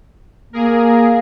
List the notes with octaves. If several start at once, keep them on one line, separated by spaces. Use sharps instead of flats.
A#3 G#4 A#4